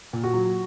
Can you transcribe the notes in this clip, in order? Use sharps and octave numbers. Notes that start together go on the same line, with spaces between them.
A#2
F#4
F#3